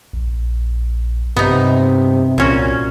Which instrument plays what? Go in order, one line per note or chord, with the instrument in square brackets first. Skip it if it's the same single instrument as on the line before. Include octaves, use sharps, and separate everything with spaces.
[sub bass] A#1
[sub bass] G2 [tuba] C3 [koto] B3 D#4
[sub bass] C2 [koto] A#2 C#4 F#4